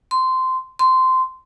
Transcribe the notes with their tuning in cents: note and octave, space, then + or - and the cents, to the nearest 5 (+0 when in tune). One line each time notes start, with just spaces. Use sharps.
C6 -15
C6 -15